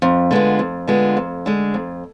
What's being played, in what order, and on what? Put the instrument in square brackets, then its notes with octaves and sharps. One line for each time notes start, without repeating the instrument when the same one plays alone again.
[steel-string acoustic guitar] F2
D3 G#3 B3 F4
F2
D3 G#3 B3 F4
F2
D3 G#3
F2